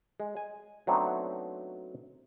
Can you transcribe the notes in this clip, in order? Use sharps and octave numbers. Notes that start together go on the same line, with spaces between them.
G#3
G#5
F#3 A3 B3 C4 D4 D#4